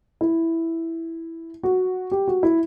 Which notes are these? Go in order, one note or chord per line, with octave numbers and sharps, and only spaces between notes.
E4
F#4
G4
F#4
E4